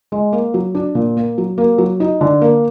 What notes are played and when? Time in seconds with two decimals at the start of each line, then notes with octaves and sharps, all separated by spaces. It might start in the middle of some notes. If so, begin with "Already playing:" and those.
0.12 G#3
0.32 A#3
0.54 F#3
0.75 D4
0.95 A#2
1.17 A#3
1.38 F#3
1.58 A#3
1.78 F#3
2.00 D#4
2.21 D3
2.41 A#3